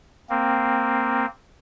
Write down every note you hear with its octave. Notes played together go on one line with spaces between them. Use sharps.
A#3 C4